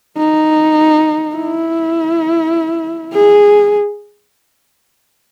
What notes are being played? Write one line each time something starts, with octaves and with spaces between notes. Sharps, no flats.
D#4
E4
G#4